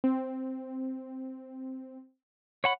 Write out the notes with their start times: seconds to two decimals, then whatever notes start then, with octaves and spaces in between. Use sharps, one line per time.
0.04 C4
2.64 C#5 F#5 B5